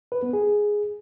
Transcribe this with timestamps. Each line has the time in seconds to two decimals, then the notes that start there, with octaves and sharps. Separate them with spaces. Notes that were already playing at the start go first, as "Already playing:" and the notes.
0.12 B4
0.23 B3
0.33 G#4